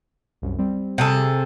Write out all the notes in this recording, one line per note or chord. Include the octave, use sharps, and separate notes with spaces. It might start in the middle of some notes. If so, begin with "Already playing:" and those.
C2 F#2
G3 C4
C3 G#4 A4